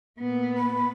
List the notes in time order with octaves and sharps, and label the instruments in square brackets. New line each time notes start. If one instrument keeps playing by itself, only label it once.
[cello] A#2 B3
[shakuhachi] B5